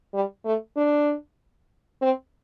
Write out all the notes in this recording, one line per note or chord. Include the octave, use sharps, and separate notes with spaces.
G3
A3
D4
C4